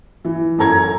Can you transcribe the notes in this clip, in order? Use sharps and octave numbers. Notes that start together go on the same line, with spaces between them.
E3
F#2 A4 A#5 G#6